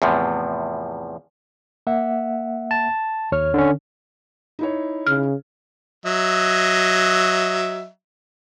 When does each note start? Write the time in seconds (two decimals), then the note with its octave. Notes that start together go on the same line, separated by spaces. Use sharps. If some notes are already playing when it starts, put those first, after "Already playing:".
0.02 E2 A2 C3 F3
1.87 A#3 E5 F#5
2.71 A5
3.32 D#2 C#5 F6
3.54 D3 C#4
4.59 D#4 E4 C#5
5.06 C#3 F6
6.06 F#3 D#5 E5